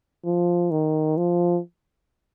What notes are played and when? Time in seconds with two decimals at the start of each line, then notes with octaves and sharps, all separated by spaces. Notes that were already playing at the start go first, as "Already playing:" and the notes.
0.25 F3
0.71 D#3
1.17 F3